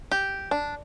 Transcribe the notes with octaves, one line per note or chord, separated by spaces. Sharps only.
G4
D4